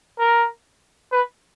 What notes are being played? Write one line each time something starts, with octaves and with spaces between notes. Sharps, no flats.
A#4
B4